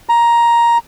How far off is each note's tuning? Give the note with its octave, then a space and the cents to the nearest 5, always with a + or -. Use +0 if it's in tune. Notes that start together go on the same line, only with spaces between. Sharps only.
A#5 +10